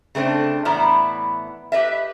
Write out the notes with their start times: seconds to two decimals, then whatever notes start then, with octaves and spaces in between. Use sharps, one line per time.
0.15 C#3 A3 C4 D4
0.65 A2 E3 B3 E4 D5 A#5
1.72 G4 B4 D#5 E5